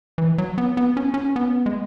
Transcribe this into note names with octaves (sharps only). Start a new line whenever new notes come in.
E3
F#3
B3
B3
C#4
C#4
B3
G#3